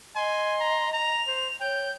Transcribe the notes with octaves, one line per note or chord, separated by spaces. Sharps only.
D#5 G#5 C6
A#5
A#5 F7
C5
C#5 G5 G6